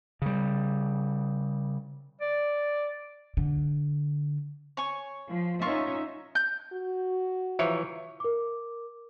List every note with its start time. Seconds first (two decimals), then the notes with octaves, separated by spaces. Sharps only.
0.22 C#3 G3
2.21 D5
3.37 D3
4.77 C#5 G#5 C#6
5.29 F3
5.62 C#4 D#4 F4 E5 C#6
6.35 G6
6.73 F#4
7.59 E3 F3 C#5 E5
8.20 A#4 D6